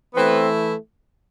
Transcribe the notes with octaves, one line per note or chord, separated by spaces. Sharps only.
E3 A3 B3 C4 E4 B4